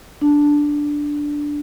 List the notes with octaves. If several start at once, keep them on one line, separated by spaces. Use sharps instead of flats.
D4